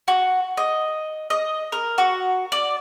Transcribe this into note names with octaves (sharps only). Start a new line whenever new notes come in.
F#4
D#5
D#5
A#4
F#4
D5